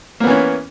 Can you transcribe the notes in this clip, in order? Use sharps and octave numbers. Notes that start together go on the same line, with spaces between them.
E3 A#3 B3 C#4